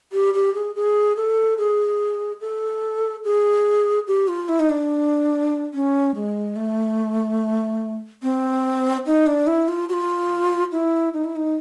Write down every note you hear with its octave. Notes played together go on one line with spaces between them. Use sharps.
G4
G4
G#4
G#4
A4
G#4
A4
G#4
G4
F4
E4
D#4
D4
C#4
G#3
A3
C4
D#4
D4
E4
F4
F#4
F4
E4
D#4
E4
D#4